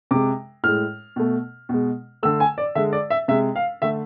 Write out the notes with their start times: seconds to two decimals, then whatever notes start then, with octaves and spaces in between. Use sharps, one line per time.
0.11 C3 G#3 D6
0.63 A2 G#3 F6
1.16 B2 A3
1.69 B2 G#3
2.23 D3 A3 E6
2.40 G#5
2.58 D5
2.75 D3 G#3 E5
2.93 D5
3.10 E5
3.28 C3 G#3 E5
3.56 F5
3.82 D3 A3 E5